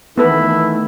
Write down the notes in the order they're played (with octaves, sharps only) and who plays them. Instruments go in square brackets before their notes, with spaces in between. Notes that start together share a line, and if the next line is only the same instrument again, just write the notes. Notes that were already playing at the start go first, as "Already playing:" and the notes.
[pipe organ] D#3 E3 A3 [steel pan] B3 A4 B4 [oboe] E4